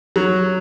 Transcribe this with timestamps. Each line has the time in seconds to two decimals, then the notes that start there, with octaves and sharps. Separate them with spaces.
0.16 F#3